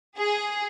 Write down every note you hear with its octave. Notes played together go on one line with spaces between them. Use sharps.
G#4